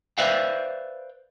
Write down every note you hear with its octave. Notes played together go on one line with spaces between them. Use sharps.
B4 C5 D5 E5 F5 G5